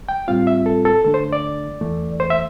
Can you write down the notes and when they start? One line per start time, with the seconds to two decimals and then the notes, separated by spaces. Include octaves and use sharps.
0.09 G5
0.28 A2 G3 C4 F4 F5
0.47 E5
0.66 A4
0.85 A4
1.05 D3 A3 D4 A4
1.14 C5
1.33 D5
1.81 E2 E3 A3
2.20 C5
2.30 E5